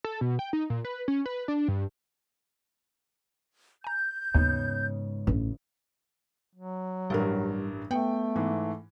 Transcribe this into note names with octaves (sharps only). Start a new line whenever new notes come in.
A4
B2
G5
D#4
A#2
B4
C#4
B4
D4
G2
G#5 A#5 G6
D#2 G#2 C#3 B3 D#4
A1 G2
F#3
A1 G2 G3 A#4
A3 B3 G5
G#2 E3